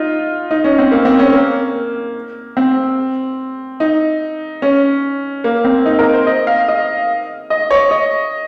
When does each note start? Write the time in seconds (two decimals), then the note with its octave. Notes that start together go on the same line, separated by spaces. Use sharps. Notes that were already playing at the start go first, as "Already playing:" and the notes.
Already playing: D#4 F4
0.51 D#4
0.64 C#4
0.78 C4
0.92 A#3
1.05 C4
1.19 C#4
1.33 A#3
2.57 C4
3.80 D#4
4.62 C#4
5.44 A#3
5.65 C4
5.86 D#4
5.99 A#4
6.13 C5
6.27 D#5
6.47 F5
6.68 D#5
7.50 D#5
7.71 C#5
7.91 D#5